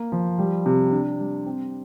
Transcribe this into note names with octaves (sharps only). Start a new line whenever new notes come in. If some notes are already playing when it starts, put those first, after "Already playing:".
Already playing: A#3
F3
G3
C3
D4
G3
C4